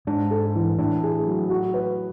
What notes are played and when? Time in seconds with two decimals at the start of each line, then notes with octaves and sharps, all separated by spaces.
0.07 G#2 G#3 D4
0.31 A4
0.55 E3
0.78 A2 A3 D4
1.03 G#4
1.26 F#3
1.50 F#4
1.74 B4